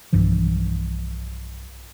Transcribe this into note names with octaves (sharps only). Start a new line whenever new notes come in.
B1 G2 E3 F3